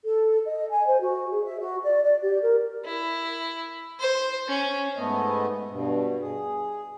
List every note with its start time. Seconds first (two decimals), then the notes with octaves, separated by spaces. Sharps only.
0.04 A4
0.46 D#5
0.69 G#5
0.87 C5
1.00 F#4
1.30 G#4
1.44 E5
1.60 F#4
1.84 D5
2.04 D5
2.21 G4
2.42 A#4
2.86 E4
4.00 C5
4.48 C#4
4.97 G#2 A3 B3 D#5
5.70 G2 B2
6.20 G#4